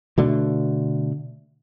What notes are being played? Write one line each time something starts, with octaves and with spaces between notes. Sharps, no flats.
B2 D3 A3